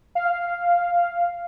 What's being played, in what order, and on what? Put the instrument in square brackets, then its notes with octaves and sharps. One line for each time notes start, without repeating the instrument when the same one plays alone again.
[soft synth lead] F5